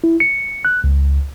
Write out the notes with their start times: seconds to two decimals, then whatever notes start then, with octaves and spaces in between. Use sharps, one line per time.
0.04 E4
0.20 C#7
0.65 F#6
0.84 C#2